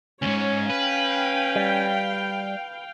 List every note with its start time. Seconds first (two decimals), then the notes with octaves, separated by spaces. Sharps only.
0.22 D2 G#2 C#4 C#5
0.70 B4 F5 G5
1.56 G3